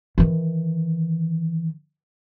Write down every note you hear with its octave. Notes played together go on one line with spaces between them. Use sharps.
D#3 E3